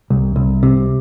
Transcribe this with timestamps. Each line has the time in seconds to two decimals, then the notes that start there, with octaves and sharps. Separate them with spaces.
0.10 C2
0.36 C2
0.63 C3